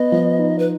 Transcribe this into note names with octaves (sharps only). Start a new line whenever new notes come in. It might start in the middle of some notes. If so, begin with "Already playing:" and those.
Already playing: B3 D#5
F3
D#4
B4